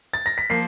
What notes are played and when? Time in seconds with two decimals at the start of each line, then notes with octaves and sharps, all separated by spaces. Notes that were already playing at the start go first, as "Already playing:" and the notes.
0.13 A6
0.26 A#6
0.38 B6
0.50 F3 A#3 C7